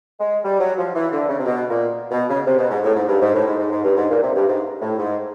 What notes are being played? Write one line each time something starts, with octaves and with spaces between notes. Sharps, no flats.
G#3
G3
F#3
F3
E3
D3
C#3
C3
B2
A#2
B2
C#3
C3
B2
G#2
A2
G#2
G2
G#2
A2
G#2
G#2
G#2
G2
G#2
A#2
C3
G2
G#2
A2
G#2